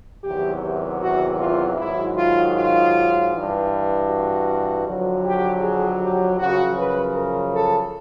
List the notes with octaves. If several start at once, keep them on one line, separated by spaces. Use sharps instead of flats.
E2 C3 D#3 F#3 G4
F#4
F4
G#2 D#3 F#3 E4
F4
F4
G2 E3
F#4
F2 D3 F#3
G4
G#4
G4
F#2 C#3 F3 F#4
B4
A#4
A4